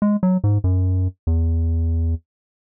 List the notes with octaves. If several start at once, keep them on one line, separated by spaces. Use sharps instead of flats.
G#3
F#3
G#2
F#2
E2